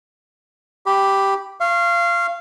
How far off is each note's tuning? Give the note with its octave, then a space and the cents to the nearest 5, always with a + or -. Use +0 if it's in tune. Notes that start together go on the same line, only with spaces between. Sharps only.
G4 +0 B5 +0
F5 -20 C#6 -30